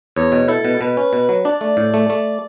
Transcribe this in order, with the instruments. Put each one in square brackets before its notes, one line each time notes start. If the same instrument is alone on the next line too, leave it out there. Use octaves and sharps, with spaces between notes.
[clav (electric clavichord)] E2 [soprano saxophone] C#5
[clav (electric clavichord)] B2
[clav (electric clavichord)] E4 [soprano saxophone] A4
[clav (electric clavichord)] B2
[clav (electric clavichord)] B2 [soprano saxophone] B4
[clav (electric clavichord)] C#4
B2
F#3
[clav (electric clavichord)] D4 [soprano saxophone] D5
[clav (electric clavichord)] A3
A2
A3
A3